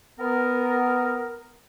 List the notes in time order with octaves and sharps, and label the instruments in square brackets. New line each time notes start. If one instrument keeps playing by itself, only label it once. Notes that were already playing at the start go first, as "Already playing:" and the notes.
[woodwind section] B3 A#4